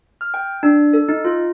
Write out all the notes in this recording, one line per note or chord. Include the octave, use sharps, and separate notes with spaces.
F6
G5
D4
A4
D#4
F4